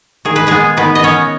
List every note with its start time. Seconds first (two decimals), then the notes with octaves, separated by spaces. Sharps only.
0.25 D#3 G#4
0.36 B4
0.47 G#3 B3 G#4
0.77 D#3 B3 B4
0.95 D#5
1.03 B3 C#4 C#5